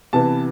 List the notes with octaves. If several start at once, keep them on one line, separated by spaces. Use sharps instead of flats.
C3 E3 B3 A5